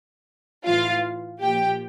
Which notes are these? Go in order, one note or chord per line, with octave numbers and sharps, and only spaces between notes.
A2 E3 F4 F5
A#2 F3 G4 G5